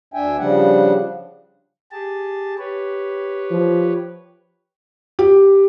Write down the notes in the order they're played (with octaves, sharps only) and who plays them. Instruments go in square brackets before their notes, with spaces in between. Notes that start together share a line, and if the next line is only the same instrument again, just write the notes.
[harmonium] D2 D4 E5 G5 G#5
C#3 F3 G3 D4 F#5
[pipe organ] G4 G#4 A5
G4 B4 C#5
[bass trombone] F3
[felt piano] G4